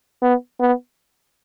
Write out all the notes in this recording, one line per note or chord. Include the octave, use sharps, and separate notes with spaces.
B3
B3